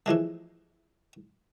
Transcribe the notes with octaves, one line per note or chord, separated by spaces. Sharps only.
E3 F3 G#3 A3